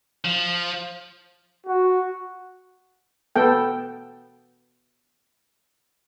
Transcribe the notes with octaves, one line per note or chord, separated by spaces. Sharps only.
F3
F#4
B3 A4 G5